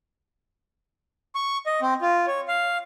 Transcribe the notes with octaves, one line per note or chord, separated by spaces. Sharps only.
C#6
D#5
C4
F4
C#5
F5